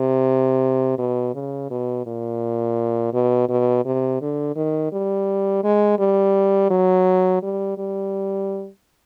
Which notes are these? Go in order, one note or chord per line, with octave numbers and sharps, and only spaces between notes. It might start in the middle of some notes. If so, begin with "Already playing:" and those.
Already playing: C3
B2
C#3
B2
A#2
B2
B2
C3
D3
D#3
G3
G#3
G3
F#3
G3
G3